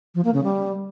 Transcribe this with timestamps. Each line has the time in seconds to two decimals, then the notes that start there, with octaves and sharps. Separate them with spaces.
0.15 F3
0.24 A#3
0.34 C#3
0.44 G3